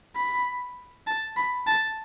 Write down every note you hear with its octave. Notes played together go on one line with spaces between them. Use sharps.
B5
A5
B5
A5